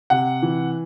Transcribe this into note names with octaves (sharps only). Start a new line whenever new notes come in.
C3 F#5
E3